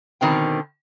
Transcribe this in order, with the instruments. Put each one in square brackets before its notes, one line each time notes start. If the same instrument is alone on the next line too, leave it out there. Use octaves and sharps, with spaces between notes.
[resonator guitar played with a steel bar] B2 D3 D#3 C4 G5